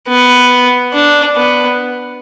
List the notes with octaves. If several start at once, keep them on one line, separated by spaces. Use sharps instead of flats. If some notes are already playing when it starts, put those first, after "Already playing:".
B3
D4
B3